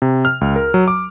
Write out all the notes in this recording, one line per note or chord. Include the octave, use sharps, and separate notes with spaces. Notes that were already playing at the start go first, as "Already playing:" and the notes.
C3
F6
C#2
A#4
F#3
D6